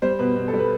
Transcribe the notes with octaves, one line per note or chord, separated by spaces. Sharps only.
G3 C5
B2 B4
B2
A4
G3
B4